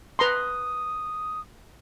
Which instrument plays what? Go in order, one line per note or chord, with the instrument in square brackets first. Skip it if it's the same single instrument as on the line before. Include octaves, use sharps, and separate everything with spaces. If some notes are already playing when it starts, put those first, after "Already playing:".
[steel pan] B4 A#5 C6 [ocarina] D#6